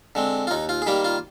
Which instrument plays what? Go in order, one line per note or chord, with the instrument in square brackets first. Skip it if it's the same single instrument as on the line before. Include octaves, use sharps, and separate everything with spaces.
[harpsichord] D3 G#3 C4
F4
D#2 D#4
F4
G#4
D#3 G3 A#3 G4
F4